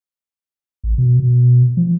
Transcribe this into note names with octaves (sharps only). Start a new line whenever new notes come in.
A1
B2
B2
F3